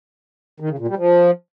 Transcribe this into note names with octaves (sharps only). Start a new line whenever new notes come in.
D#3
C#3
A#2
G3
F3